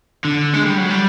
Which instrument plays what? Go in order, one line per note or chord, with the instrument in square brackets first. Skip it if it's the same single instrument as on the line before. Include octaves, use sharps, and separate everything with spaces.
[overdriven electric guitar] D3
G#3
G3
F#3
G3